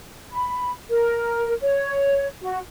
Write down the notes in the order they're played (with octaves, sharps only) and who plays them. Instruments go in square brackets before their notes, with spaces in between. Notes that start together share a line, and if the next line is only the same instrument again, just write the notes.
[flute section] B5
A#4
C#5
F#4